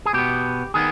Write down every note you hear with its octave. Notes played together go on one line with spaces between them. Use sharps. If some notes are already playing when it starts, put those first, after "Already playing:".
G#4
B2 B3 G4
D#3 B3 G#4